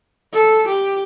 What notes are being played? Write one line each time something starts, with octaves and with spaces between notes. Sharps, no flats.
A4
G4